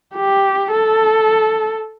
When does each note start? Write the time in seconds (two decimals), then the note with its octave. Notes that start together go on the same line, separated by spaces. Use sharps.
0.15 G4
0.71 A4